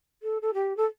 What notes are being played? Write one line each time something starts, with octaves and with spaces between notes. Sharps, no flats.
A4
A4
G4
A4